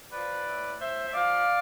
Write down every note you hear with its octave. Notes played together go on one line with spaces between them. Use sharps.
F3 B4 D5
A2
A2 C5 E5
E5
F3 D5 F5